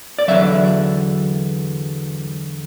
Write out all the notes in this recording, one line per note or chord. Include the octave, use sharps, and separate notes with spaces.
D5
E2 D3 F#3 E5